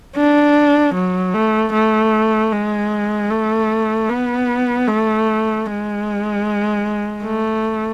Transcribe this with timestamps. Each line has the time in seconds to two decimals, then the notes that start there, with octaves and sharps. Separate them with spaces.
0.16 D4
0.94 F#3
1.34 A3
1.73 A3
2.52 G#3
3.31 A3
4.09 B3
4.88 A3
5.66 G#3
7.24 A3